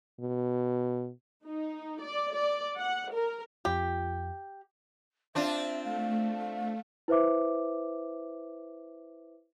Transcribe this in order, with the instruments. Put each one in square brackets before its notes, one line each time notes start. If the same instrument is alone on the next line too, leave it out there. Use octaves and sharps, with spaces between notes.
[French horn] B2
[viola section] D#4
D5
D5
F#5
A#4
[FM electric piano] F2 F4 [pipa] G4
[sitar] C4 D4 F4 [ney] E5
[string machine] A3 [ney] F5
[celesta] E4 B4 C5 E5 D6